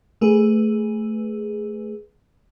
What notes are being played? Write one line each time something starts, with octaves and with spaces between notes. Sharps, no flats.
A3 G#4 B4